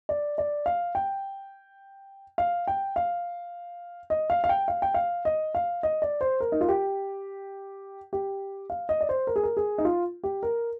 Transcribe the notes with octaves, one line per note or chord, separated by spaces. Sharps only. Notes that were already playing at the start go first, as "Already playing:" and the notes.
D5
D5
F5
G5
F5
G5
F5
D#5
F5
F5
G5
F5
G5
F5
D#5
F5
D#5
D5
C5
A#4
D#4
F4
G4
G4
F5
D#5
D5
C5
A#4
G#4
A#4
G#4
D#4
F4
G4
A#4